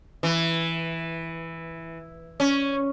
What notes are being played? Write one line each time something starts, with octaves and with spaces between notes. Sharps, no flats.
E3
C#4